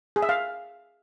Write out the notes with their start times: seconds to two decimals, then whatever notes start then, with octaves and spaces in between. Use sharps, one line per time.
0.16 G#4
0.22 E5
0.29 F5